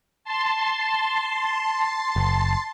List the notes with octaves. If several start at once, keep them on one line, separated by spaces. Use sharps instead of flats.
A5 C6
F#1